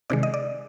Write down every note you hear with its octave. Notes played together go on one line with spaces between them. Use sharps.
C3 D#3 G#3 D5
D#5
D5